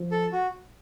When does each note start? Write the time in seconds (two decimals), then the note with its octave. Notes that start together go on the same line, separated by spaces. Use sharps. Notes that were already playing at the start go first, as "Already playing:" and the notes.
Already playing: F3
0.11 A4
0.32 F#4